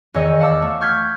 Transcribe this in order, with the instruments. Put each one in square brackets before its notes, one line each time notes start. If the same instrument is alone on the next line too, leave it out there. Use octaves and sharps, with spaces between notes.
[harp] E2 D#3 C#5 D#5 E6
F5 F#5 A5 D6 E6
A3
C#6 F6 G6 G#6 B6